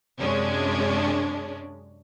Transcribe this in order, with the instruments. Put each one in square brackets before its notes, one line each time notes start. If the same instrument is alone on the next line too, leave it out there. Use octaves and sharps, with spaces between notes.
[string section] F#2 C3 G#3 C#4 D4